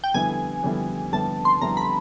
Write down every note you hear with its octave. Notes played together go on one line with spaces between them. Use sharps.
G5
F2 D3 G3 B3 E4 G#5
F2 D3 G3 B3 E4
F2 D3 G3 B3 E4 A5
C6
F2 D3 G3 B3 E4 A#5
B5